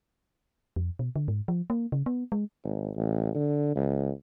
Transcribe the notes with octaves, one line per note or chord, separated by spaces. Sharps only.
F2
B2
D3
G#2
F3
A#3
C#3
B3
G#3
G#1
A1
D3
C#2